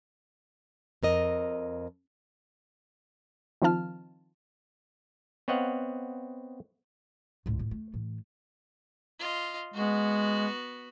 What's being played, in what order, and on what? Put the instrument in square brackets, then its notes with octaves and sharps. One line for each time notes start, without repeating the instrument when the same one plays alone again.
[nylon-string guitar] F2 A#4 D#5
[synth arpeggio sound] D#3 F3 C4 F4 A5 F6
[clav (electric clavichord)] B3 C4 C#5 D#5 F5 F#5
[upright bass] C#2 A2
A2
A3
A2 E3
[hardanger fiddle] F4 D#5
[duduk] G#3 [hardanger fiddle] B3 F#4